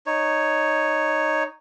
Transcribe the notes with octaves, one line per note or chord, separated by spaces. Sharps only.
D#4 C#5